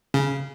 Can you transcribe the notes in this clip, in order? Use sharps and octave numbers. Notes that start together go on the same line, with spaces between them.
C#3